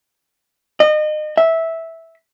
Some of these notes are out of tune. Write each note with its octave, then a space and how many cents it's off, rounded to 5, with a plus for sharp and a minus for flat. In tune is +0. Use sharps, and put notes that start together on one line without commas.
D#5 -30
E5 -10